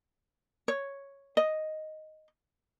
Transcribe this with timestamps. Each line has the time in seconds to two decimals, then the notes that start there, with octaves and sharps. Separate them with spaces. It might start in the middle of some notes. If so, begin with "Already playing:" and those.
0.68 C#5
1.37 D#5